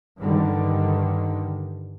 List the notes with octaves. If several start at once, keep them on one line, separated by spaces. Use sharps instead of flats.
G2 D3 D#3 G3